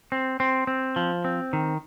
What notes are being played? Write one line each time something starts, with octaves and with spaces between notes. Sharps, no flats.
C4
C4
C4
F3
C4
D#3